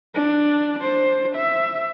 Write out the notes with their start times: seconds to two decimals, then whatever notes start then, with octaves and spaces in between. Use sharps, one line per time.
0.15 D4
0.80 D4 C5
1.36 E5